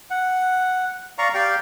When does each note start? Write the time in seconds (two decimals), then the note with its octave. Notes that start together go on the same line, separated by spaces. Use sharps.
0.10 F#5
1.18 D5 F5 A#5 C#6
1.34 G4 D5 F5 G5